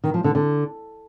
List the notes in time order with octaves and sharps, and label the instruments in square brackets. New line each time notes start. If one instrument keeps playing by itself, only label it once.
[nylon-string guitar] D#3
F3
D3
D3